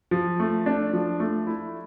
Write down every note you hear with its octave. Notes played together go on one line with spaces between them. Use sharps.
F3
A3
D4
F3
A3
E4